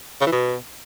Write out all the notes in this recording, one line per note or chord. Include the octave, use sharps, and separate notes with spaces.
C#3
E3
B2